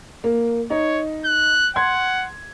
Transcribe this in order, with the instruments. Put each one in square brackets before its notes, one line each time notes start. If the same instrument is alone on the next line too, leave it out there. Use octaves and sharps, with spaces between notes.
[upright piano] A#3
[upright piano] D#4 [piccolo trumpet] C#5
[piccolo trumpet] F#6
[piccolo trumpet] F#5 [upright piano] C6 G#6